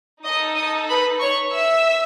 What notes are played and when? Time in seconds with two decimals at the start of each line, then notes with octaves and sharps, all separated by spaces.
0.24 D#4 A4 D#5 D#6
0.56 D#5 D#6
0.89 B4 B5
1.20 C#5 C#6
1.53 E5 E6